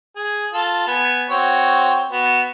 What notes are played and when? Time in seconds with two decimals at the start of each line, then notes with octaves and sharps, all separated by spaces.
0.16 G#4
0.53 F4 A4
0.87 B3 G#5
1.30 C4 F#4 C#5
2.11 B3 F#4